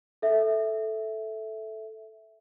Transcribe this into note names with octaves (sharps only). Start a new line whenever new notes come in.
A4 E5